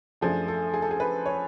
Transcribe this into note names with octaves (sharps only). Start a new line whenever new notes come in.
F#2 F3 A3 D4 G#4
A4
G#4
A4
G#4
B4
C#5